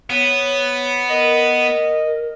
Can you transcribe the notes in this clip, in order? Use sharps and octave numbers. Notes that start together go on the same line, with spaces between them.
B3 C#5
A#4 D#5